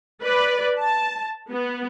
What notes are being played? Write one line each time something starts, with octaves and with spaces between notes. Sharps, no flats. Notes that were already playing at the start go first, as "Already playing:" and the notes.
B4 D5
A5
B3